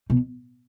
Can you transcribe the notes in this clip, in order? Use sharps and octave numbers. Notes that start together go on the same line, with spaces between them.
B2